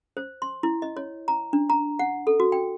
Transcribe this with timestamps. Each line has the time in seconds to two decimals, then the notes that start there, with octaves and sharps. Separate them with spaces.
0.17 C5
0.42 C6
0.63 E4
0.82 D#5
0.97 C#5
1.28 A#5
1.53 D4
1.70 A#5
1.99 F#5
2.27 A4
2.40 F#4
2.52 G5